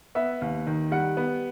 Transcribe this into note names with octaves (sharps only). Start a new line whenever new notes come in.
B3 E5
D#2
D#3
G3 F#5
B3